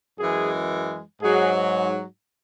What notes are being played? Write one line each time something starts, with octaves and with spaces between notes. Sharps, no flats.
F#2 E3 G#3 G#4
G#2 F#3 G#4